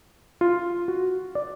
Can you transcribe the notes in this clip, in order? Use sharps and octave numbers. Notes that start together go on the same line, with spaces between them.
F4
F#4
D5